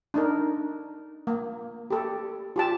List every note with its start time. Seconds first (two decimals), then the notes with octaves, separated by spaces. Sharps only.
0.14 D4 D#4 A#4
1.27 A#3
1.90 G4 A4
2.56 F4 G4 A5